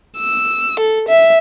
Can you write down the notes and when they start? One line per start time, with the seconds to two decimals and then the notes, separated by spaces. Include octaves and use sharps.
0.18 E6
0.80 A4
1.08 E5